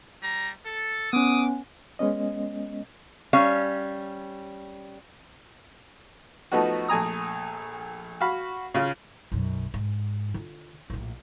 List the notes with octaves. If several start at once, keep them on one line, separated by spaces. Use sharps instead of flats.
G3 A#5
A4
B3 C#4 D6 D#6
G#3 B3 C#4 D#5
G3 C#4 F5
F3 A3 B3 D#4 F#4
A#1 A3 G#5 A#5 D#6
F#4 F5 B5
C#3 F4
B1 F#2
G#2
D3 F4
A#1 A2